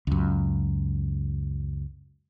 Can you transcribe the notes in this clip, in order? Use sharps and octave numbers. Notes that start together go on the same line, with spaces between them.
C#2 F#2